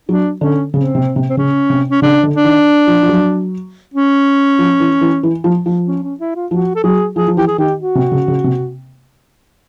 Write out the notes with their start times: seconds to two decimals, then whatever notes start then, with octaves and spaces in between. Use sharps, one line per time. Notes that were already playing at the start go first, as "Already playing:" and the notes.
0.09 F#3 D4
0.41 D3 C#4
0.73 C#3 C4
0.95 C3
1.16 C3
1.29 C4
1.37 C#3 C#4
1.70 C3
1.90 C#4
2.02 C#3 D4
2.23 D3
2.34 D4
2.45 D#3
2.87 F3
3.03 F3
3.09 F#3
3.94 C#4
4.59 F3
4.80 E3
5.01 E3
5.23 E3
5.44 F3
5.66 F3
5.87 C#4
6.03 C#4
6.20 E4
6.36 F4
6.51 F3 F#4
6.75 A4
6.84 F#3 G#4
7.15 F3 G#4
7.28 F3
7.37 E3 G4
7.47 G#4
7.58 D#3 G4
7.80 F#4
7.95 C3
8.12 C#3
8.28 C#3
8.44 C3